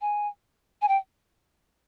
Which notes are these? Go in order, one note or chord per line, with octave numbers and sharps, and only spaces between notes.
G#5
G#5
G5